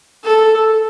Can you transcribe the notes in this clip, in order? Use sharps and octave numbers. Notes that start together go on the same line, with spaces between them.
A4